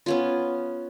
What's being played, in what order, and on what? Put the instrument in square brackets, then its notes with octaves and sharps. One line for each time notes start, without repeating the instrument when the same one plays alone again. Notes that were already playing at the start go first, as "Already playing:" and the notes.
[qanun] B3 C#4 F4